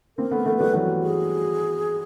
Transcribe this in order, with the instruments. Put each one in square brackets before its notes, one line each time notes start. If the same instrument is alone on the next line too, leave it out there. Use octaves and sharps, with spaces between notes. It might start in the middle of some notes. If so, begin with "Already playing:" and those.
[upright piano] A#3 C4 [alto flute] A#4
[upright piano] A3 B3
[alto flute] A#4
[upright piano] A3 B3
[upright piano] G3 A3 [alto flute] B4
[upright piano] E3 F#3
[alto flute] G#4